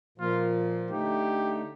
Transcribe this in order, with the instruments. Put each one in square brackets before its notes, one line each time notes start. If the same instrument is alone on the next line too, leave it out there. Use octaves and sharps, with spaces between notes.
[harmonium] A#2 F3 A#3 [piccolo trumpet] F4
[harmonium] D3 A3 D#4 [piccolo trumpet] G4